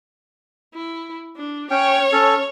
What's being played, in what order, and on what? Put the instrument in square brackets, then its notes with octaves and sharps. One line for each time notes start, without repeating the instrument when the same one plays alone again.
[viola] E4
D4
[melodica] C#4 G5 [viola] C#5
[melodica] C#4 A4